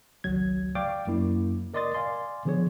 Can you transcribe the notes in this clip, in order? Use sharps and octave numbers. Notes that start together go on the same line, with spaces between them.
G#1 C#2 F#3 G#6
D5 F5 G5 C#6 D6
F#2 A#3 E4
A#4 D5 D#5 C6 D#6 A6
D5 F5 G#5 C6
D3 F3 B3 G#4 C#5